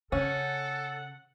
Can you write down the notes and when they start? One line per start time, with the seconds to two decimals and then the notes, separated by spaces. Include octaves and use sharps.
0.12 C#3 C#4 A4 F#5